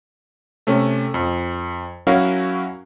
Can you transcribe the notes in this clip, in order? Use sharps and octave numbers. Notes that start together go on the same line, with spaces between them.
C3 A3 C#4
F2
F#3 C#4 E4 F#4 A#4 F5